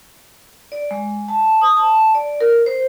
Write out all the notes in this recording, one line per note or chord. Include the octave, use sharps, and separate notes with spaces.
D5
G#3
A5
D#6
A5
D5
A#4
C5